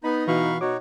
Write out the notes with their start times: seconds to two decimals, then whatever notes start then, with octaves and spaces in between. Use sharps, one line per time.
0.04 B3 D#4 B5
0.28 B2 E3 F5 B5 C#6
0.61 B2 D#4 F#4 C#5 D6